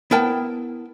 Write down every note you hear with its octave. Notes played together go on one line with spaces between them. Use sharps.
B3 E4 A#4 G5 A5